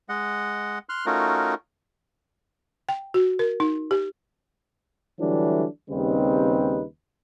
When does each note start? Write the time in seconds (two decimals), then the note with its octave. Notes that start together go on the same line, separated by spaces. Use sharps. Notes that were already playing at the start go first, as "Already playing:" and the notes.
0.09 G#3 D#5 F#5
0.89 C6 F6 F#6
1.06 A3 C#4 D#4 F4 F#4 A#4
2.89 G5
3.14 F#4
3.39 A#4
3.60 D#4
3.91 G4
5.20 D3 E3 F#3 G3 A3 D4
5.90 D#2 C#3 G3 C4 D#4 B4